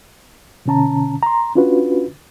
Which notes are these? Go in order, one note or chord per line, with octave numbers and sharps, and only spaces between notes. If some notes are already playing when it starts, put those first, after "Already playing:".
B2 D3 C#4 A5 A#5
A#5 C6
C#4 D4 F4 F#4 B4